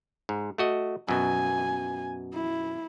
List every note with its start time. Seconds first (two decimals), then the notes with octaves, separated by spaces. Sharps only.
0.29 G#2
0.58 A3 F#4 D#5
1.08 F#2 B2 G#5
2.34 E4